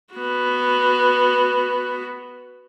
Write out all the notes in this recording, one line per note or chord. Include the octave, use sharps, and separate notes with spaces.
B3 F#4